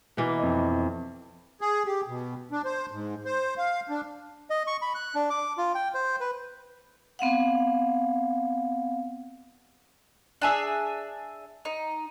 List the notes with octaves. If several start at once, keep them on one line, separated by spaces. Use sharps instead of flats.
B2 E3 A#3
F2 D#5
G#4
G4
B2
D4
C5
G#2
C5
F5
D4
D#5
C#6
B5
F#6
D4
D6
F4
G5
C5
B4
B3 C4 F5 F#5
D4 G#4 E5
D#4